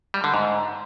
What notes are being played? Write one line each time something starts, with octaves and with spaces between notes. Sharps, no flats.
G3
D3
G#2